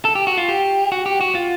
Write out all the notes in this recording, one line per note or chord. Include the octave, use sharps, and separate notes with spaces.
A4
G4
F#4
F4
G4
F#4
G4
F#4
F4